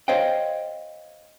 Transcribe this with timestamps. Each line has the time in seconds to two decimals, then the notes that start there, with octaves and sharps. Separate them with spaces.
0.08 C5 C#5 D#5 F5 G5